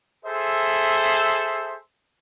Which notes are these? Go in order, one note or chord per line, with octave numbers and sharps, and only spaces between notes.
G#4 A4 C5 E5